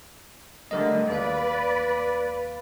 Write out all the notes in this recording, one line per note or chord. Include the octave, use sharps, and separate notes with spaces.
D3 G3 A3 A#4 D#5
D#2 B4 D5 F5